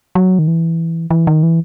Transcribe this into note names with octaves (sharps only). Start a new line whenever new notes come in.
F#3
D#3
E3
E3
D#3
E3